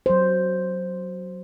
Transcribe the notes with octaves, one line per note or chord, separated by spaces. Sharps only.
F#3 C5